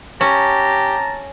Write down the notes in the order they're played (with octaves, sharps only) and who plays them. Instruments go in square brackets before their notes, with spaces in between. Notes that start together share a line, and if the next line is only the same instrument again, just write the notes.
[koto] C#4 [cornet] G4 [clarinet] A5 [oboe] A#5